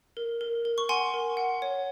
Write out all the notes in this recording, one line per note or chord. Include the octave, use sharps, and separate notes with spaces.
A#4
A#4
A#4
C#6
F#5 G#5 C6
A#4
F#5
C#5